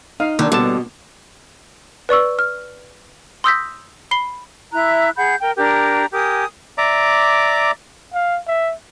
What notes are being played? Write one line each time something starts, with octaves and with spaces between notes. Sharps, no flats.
D#4 F5
D3 D#3 F#3 A#3 D4
A1 B2 D3 G3 B3 A5
B4 D5 C#6 E6
F6
C6 D#6 E6 G6 A#6 B6
B5 C7 G7
E4 E5 A#5 F#6
G#4 F#5 B5 G6
A#4 G5
D4 G4 A#4 A#5
G4 A#4 G#5 D#6
D5 E5 A#5 D6
F5
E5